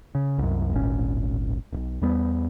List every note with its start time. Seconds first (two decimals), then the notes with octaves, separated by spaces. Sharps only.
0.15 C#3
0.38 C2 F#2
0.72 D1 G#1 A#2 C#4
1.73 D1 B1
2.02 E2 G3 B3